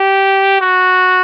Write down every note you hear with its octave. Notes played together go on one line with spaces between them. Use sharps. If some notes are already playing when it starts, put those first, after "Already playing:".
Already playing: G4
F#4